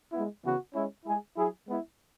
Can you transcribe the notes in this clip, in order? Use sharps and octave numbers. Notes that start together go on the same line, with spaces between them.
G#3 B3 E4
C#3 E3 B3 F#4
G#3 C#4 E4
G#3 E4 G#4
F#3 E4 G#4
G#3 B3 E4